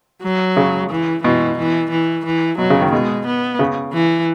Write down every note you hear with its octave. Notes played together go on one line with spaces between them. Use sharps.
F#3
C#3
E3
B2 E3
E3
E3
E3
B2 F#3
C#3
D#3
B2 G#3
B3
C#3
E3